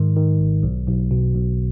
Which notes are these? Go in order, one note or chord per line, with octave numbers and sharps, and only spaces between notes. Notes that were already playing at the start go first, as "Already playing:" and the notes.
Already playing: G#2 D#3
D#3
G#1
B1
B1
B2
B1